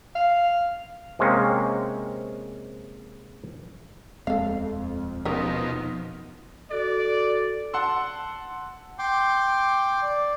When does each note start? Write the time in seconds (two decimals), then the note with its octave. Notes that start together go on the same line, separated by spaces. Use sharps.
0.15 F5
1.19 C3 G#3 A#3 C4 C#4
4.27 D#1 F2 G#3 C4 A4 F5
5.25 B2 F3 C#4 D#4 A#4
6.71 F#4 A4 D5
7.74 F#5 A5 C6 E6
8.99 G5 C6 D6
10.02 D5